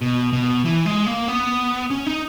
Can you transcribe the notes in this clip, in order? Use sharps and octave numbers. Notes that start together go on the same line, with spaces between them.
B2
B2
E3
G#3
A#3
B3
C#4
D#4